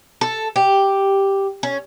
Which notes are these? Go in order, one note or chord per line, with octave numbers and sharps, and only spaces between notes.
A4
G4
C#4